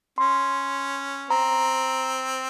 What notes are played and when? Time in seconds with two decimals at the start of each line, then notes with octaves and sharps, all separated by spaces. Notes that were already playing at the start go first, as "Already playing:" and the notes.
0.18 C#4 C6
1.30 C4 A#5